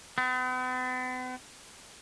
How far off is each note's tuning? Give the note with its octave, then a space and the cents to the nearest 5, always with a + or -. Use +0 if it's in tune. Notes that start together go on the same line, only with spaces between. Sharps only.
B3 +45